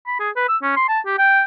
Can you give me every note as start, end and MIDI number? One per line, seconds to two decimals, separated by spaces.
0.07 0.16 83
0.20 0.30 68
0.36 0.46 71
0.48 0.57 88
0.62 0.72 61
0.77 0.86 84
0.89 1.00 81
1.06 1.17 67
1.18 1.44 79